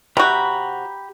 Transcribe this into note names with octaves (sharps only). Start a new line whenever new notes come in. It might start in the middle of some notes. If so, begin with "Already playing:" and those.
C3 F#4 G4 A#5 B5